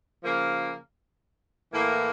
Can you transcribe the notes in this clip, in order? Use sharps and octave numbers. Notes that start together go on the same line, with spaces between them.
C#3 F3 A#3
A2 E3 A#3